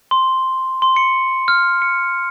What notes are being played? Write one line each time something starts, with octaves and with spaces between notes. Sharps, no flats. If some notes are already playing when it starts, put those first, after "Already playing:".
C6
C6
C#7
F6
C#7